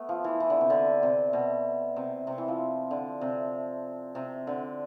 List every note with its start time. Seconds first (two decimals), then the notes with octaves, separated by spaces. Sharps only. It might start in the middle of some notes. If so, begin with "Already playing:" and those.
Already playing: A3 B3
0.09 F3
0.24 E3
0.40 E3
0.50 D3
0.61 C3
0.70 D3
1.03 C3
1.33 B2
1.96 C3
2.27 C3
2.38 E3
2.48 F3
2.91 D3
3.21 C3
4.15 C3
4.47 D3